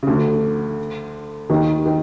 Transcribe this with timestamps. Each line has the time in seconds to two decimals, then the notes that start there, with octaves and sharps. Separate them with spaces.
0.03 C#3
0.07 D2 D3
1.50 D#2 D#3
1.86 D#3